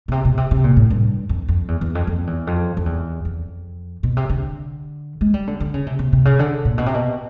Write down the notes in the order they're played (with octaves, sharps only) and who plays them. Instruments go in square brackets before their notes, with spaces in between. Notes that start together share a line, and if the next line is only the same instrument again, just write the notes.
[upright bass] B2
C3
B2
C3
C3
A#2
A2
G2
F2
F2
E2
E2
F2
F2
E2
F2
F2
E2
F2
B2
C3
D3
G#3
G3
D3
D3
C#3
C3
C3
C3
C#3
D3
A#2
B2
C3
B2